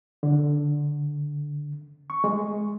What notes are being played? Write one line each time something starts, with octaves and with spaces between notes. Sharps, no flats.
D3
C#6
G#3